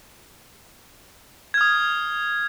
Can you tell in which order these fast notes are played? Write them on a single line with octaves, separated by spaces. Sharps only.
G#6 F6 D#6